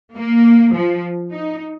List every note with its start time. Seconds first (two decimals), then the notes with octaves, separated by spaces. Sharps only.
0.17 A#3
0.75 F3
1.32 D#4